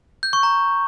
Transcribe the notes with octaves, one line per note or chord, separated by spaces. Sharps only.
G6
C#6
A#5